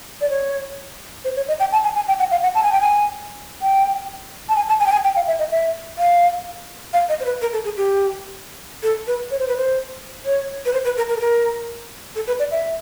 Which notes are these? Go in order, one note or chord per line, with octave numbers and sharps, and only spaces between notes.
D5
C#5
C5
C#5
D#5
G5
A5
G#5
G#5
G5
F#5
F5
F#5
A5
G#5
G5
G#5
G5
A5
G#5
A5
G#5
G5
G#5
G5
F5
E5
D#5
E5
F5
F5
D#5
C5
B4
A#4
A4
G#4
G4
A4
B4
C#5
C5
B4
C5
C#5
B4
C5
B4
A#4
A#4
A4
A#4
A4
B4
D5
E5